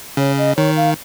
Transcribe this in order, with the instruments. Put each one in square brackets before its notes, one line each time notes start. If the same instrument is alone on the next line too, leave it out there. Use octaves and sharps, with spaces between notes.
[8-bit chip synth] C#3 [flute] C#5
[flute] D#5
[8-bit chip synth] D#3 [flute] C#5
[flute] F5